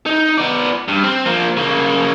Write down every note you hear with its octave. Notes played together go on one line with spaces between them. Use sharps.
D#4
B3 D5
G2
C4
F3 A#3
C#3 A#3